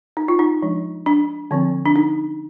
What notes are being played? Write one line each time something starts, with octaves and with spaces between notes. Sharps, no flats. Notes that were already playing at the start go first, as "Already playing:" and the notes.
D#4
F4
D#4
F3 G#3 D4
D4
D3 F3 C4
D4
D#4